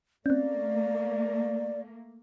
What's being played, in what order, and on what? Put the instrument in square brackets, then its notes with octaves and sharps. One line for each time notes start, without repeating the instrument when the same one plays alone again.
[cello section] A3 A#3 [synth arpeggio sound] C4 C#4 [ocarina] D5